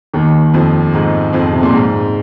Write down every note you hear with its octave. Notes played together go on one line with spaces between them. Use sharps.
D#2 D#3
F2 F3
G#2 G#3
F2 F3
C3
A#2
G#2